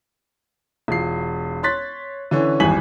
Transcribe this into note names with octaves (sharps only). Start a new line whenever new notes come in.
E1 F4 C7
C#5 C6 F#6 A6 B6
D3 E3 C#4
G#1 E2 G2 G#5 B6 F#7